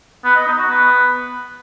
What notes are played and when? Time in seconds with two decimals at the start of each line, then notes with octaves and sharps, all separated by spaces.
0.25 B3
0.36 D#5
0.47 D#4
0.58 F#4
0.70 B3